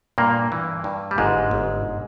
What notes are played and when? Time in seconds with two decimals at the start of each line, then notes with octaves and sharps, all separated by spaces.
0.18 G2 A#2 A#3
0.52 E3
0.84 G2
1.11 G3
1.18 G1 G#2 G#3
1.51 G1